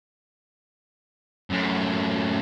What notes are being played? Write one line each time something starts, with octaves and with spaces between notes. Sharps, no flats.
F#2 A2